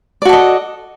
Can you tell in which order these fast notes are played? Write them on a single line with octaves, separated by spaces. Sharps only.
D5 F#4 A4 D#5